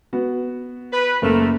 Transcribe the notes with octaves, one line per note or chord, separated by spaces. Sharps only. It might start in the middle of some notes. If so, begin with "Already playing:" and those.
B3 F#4
B4
F#1 A3 A#3 A#4